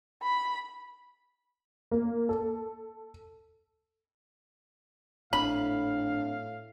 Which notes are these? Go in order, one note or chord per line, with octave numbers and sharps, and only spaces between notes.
B5
A#3
A4
G#1 A2 C4 D4 F5 B5